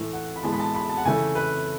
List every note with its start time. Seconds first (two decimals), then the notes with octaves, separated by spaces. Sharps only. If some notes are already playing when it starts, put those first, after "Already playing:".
Already playing: A2 E3 A3
0.13 F#5
0.36 B5
0.43 A2 E3 G#3 B3 A5
0.52 B5
0.60 A5
0.75 B5
0.89 A5
0.97 F#5
1.05 C#3 E3 A3 G#5
1.35 B4